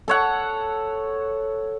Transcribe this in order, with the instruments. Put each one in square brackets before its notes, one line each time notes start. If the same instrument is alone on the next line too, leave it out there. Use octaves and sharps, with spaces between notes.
[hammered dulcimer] A4 C#5 F#5